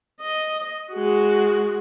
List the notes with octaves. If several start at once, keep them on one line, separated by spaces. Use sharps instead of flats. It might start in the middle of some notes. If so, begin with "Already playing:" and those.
D#5
G#3 F#4